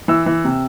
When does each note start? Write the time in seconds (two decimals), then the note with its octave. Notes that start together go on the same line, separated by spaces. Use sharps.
0.08 E3 E6
0.26 E3
0.45 C3